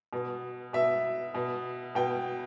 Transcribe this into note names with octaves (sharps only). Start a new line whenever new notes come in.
B2
B2 E5
B2
B2 G5